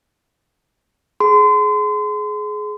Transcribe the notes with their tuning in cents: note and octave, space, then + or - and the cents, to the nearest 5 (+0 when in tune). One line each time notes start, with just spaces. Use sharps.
G#4 +20 C6 -35